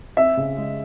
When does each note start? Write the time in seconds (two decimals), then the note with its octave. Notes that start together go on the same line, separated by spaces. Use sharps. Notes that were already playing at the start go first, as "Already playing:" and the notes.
0.17 C4 E5
0.37 C#3
0.57 G#3